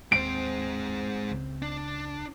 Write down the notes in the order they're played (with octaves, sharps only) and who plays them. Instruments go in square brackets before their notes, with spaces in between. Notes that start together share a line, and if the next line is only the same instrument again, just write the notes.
[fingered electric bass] D#2 [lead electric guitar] G#3 C5 [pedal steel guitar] C4 [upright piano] D7
[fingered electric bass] C#2 C#3
[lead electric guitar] D4